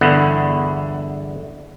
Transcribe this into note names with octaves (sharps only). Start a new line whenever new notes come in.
G1 E2 D3 E4 F#5